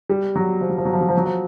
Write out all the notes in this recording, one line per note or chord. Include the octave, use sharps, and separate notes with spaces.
G3
F#3
F3
F#3
F3
F#3
F3
F#3
F3
F#3
F3